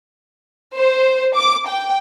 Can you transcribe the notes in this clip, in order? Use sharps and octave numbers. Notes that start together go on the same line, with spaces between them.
C5
D6
G5